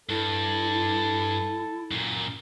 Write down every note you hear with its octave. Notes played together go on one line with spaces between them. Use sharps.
G2 E4 A4
F#2 A#2